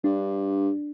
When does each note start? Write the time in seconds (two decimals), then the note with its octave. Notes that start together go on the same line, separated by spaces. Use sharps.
0.04 G2 D4